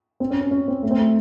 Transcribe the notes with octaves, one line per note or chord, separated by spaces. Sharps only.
C4
C#4
C#4
C#4
C4
A3
C4
A3